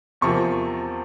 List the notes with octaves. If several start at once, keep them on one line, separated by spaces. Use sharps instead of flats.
E2 C3 F3 A#3 C#6